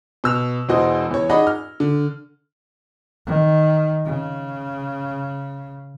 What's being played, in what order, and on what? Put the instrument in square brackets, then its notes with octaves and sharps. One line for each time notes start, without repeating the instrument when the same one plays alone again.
[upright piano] B2 E6 F7
E1 E2 F#4 C5 D#5
E2 C#5
D#4 G#4 D5 D#5 F#5 B5
F6
D3
[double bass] D#3
C#3